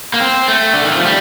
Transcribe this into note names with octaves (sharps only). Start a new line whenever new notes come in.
A#3
C4
A3
D3
D#3
F3
G3